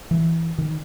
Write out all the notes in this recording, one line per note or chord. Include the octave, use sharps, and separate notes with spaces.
E3
D#3